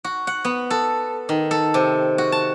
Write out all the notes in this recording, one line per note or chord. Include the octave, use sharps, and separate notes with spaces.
F#4
F#5
B3
A4
D#3
A4
C3
F#4
A5